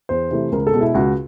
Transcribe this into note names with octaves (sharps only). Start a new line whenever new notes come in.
E2 C5
C3 E3 A3
C#2 A#4
A4
B2 G#3
E4
C#2 F#4